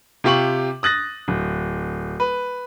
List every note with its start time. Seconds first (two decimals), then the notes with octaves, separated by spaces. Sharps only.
0.24 C3 F4 G4 C#6 F#7
0.83 D#6 F#6 A6 A#6
1.28 D1
2.20 B4